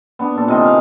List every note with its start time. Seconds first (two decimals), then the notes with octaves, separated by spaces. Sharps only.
0.19 B3 D4
0.35 A#2 A4
0.48 C3 D#3 D#5 G#5
0.64 F5